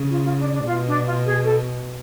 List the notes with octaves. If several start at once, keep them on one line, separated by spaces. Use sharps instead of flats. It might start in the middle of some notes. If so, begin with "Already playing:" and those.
Already playing: C#3
F4
F4
D4
D4
B2 F4
D4
F4
G#4
A4